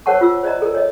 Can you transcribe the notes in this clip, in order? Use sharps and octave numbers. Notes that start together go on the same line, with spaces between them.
A#4 C5 C#5 F#5 A5 C#6
F4 E6
C5 D5 D#5 A#5
A4 A#4
C#5 D#5